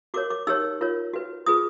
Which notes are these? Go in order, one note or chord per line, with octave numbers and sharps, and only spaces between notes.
F#4 A#4 C#5 D6
D6
D#4 G4 A#4 C#5 E6
F4 A#4 C#5
F#4 B4
F4 G#4 B4 D#6